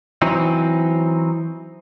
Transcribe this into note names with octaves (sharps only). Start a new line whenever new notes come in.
E3 F#3 C4 D#4